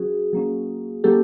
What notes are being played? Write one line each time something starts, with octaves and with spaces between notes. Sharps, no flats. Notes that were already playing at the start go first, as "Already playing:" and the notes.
Already playing: F#3 C#4 F#4 G#4
F#3 A#3 C#4
F#3 A#3 C#4 G4 A4